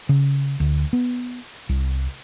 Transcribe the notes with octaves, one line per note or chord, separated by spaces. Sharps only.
C#3
D2
B3
C2